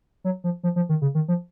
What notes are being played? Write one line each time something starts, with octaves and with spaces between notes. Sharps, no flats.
F#3
F3
F3
F3
D#3
C#3
D#3
F3